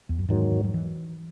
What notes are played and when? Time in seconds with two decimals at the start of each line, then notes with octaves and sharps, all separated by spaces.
0.09 E2
0.19 F#2
0.29 E2 G#2 D#3 F#3
0.64 F#3
0.74 E3